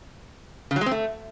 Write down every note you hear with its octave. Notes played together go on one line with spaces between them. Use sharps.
C#3
F#3
G#3
C4
A3